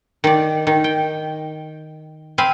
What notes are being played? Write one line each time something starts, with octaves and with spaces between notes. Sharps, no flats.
D#3 D5
D#3
G5
C4 F5 G#5 B5